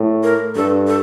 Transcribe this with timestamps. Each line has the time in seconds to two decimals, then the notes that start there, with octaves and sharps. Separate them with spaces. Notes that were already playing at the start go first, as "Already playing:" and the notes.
Already playing: A2
0.23 A#4
0.55 G2 A4
0.87 A4